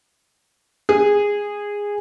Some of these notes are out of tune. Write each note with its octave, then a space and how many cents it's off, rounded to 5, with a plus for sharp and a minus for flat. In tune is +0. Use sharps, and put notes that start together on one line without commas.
G#4 -15